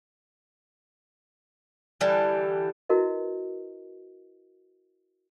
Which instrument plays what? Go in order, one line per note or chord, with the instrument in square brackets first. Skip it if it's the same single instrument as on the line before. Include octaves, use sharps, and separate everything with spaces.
[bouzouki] D3 E3 G3 A4
[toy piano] E4 F#4 A#4 B4 D#5